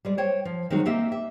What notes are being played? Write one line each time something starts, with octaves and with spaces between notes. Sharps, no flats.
G3 G#3 D5
C5 C#5 G5
F3
D#3 F#3 G#3 C4 D#4 F#4
A#3 C4 G4 D#5 E5
E5